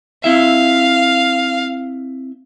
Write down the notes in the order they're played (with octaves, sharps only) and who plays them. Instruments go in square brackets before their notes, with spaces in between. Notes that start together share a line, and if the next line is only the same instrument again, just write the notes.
[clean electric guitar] C4 E4 E5 [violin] F5